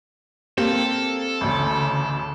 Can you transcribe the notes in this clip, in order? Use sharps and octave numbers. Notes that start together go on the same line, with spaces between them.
A#3 C4 G4 A4 C5
A1 D2 C#3